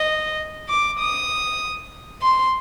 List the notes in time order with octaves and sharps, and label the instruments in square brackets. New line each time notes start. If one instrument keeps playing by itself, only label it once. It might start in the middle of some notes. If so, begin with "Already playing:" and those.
Already playing: [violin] D#5
D6
D#6
C6